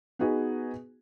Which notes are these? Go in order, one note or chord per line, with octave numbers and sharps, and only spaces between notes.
B3 D#4 F#4 G#4 B4